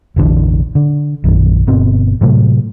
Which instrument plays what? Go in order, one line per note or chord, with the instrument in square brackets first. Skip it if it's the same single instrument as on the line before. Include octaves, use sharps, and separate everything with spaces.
[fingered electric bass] F1 A#1 D3 E3
D3
A#1 F#2 D#3
G1 B2 C4
A2 C3 F#3 A3